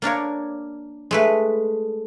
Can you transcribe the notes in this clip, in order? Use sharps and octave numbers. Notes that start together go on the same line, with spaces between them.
A#3 D4 A#4 C#5
G#3 A3 B4